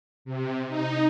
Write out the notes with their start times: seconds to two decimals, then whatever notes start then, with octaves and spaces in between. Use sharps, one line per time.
0.25 C3
0.68 D#4